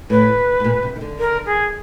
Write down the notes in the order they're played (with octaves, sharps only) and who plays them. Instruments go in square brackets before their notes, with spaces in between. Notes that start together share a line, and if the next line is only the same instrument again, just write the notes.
[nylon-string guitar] A2 [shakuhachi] B4
[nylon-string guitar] A2
A#2
C3
D#3
D3
[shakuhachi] A#4
G#4